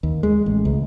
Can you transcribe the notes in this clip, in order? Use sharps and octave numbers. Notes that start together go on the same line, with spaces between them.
D#2
G#3
A1
C#2